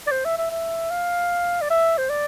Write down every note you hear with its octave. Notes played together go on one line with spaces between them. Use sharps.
D5
C5
E5
E5
E5
F5
D5
E5
C5
D5